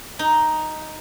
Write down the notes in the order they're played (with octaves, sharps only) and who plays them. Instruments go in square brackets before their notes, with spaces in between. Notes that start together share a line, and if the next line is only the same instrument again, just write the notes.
[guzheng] D#4